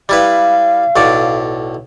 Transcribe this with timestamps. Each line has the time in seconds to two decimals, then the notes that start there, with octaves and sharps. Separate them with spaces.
0.09 G3 E4 B4 F5
0.96 B1 A2 D5